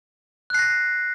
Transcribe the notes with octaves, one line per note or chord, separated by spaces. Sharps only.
F#6 A#6 C7